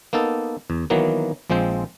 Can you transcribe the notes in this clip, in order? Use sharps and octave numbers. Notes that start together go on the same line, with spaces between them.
A#3 B3 D#4 A4
E2
D#3 E3 F#3 A#3 B3
A#1 F3 G#3 C4 G5